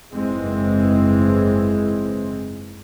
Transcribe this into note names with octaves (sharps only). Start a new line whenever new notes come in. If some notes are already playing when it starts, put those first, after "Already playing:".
F#1 G#2 E3 G#3 C4